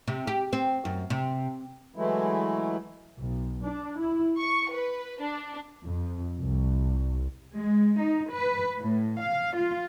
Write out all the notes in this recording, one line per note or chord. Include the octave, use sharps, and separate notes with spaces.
C3
G4
C4
F#2
C3
E3 F#3 G#3 A3 E4
B1
D4
E4
C#6
B4
D4
F2
C2
G#3
D#4
B4
A2
F5
F4